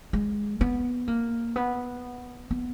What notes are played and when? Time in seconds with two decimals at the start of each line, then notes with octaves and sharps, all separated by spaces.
0.13 G#3
0.61 B3
1.08 A#3
1.56 B3
2.51 B3